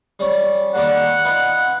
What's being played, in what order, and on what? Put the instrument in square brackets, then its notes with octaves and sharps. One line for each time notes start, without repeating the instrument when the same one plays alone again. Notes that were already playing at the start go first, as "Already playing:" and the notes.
[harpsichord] G3 C#4
[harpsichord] D#3 G3 A#3 [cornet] F#5
[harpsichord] D#4 F4 B4